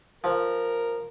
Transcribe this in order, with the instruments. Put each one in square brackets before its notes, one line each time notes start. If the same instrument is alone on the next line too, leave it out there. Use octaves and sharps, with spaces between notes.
[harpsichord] F3 [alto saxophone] A#4